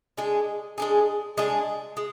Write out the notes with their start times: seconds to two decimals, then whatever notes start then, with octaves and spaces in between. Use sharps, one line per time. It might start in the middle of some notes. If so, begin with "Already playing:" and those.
0.17 G#3 D4 G#4
0.78 G#3 D4 G#4
1.37 G#3 D4 G#4
1.97 G#3